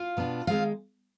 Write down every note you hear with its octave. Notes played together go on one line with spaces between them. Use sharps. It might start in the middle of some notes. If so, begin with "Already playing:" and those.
Already playing: F4 F5
B2 B3 D4
D#3 G#3 C4 F4 F5